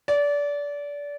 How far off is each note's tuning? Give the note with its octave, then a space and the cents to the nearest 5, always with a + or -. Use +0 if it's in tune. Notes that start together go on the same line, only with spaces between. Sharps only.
D5 -25